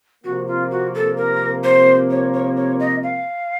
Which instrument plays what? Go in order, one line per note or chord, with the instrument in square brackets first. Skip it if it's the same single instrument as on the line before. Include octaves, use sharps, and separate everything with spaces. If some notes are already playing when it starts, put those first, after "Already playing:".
[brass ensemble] C3 F3 A#3 [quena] F#4
[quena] F4
F#4
A4
A#4
C5
C#5
C#5
C#5
D#5
F5